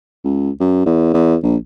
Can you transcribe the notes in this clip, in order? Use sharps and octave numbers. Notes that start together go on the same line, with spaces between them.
C#2
F#2
E2
E2
A#1